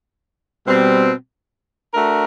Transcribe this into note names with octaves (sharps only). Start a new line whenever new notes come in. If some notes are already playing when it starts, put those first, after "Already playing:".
B2 G3 C4
A3 D4 F#4 A#4